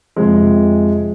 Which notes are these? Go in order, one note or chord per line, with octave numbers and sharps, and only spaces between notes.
F2 C3 F3 G#3